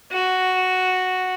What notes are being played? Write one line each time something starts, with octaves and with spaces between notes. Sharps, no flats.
F#4